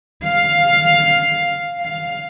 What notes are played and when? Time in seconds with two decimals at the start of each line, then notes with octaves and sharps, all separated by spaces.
0.25 F5
1.79 F5